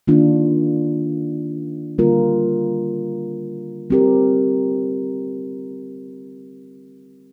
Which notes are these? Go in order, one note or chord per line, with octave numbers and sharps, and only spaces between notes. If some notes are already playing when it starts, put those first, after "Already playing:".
D#3 A#3 D4 F4
D3 G3 A#3 F4 A#4
G3 C4 G4 A#4